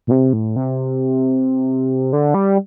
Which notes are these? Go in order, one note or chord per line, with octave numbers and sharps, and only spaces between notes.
A#2
C3
A2
C3
D3
G3